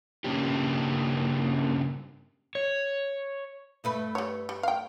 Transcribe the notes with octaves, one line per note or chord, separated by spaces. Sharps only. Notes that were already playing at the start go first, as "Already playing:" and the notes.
G2 C#3 A#3 C#4 D4 G4
C#5
G2 A3 B4
G3 C#5
G3
F5 G5